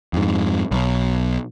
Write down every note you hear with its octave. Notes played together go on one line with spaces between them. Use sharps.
F2 G#2
B1